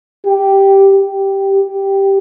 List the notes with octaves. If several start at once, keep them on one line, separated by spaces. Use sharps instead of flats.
G4
G4
G4